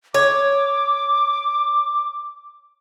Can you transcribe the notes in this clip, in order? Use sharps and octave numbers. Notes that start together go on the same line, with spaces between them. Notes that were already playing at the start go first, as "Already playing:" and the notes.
C#5 D6